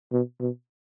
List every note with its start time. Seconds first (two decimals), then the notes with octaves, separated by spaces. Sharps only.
0.13 B2
0.41 B2